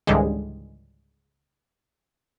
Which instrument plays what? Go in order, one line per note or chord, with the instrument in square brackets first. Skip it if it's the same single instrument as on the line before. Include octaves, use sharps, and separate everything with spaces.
[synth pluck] C#2 G#2 D3 E3 G3 G#3